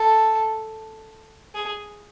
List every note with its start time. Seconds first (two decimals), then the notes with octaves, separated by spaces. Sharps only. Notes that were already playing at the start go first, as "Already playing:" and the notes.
Already playing: A4
1.55 G#4